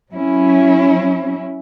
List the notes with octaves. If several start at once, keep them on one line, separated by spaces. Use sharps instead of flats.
F#3 C#4 E4